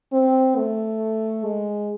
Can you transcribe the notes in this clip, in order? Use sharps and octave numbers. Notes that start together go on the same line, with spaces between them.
C4
A3
G#3